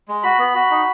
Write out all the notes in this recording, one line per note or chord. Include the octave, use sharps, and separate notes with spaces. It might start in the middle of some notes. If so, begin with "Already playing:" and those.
G#3
F#4 B5
B3
F#4
D#4